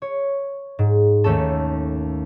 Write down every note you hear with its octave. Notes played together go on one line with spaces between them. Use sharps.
C#5
G#2
D#2 A3 C#4 A4